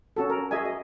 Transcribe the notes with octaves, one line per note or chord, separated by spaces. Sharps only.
C#4 F#4 A4
A#4
F#4 G#4 D#5 E5 G#5
D#5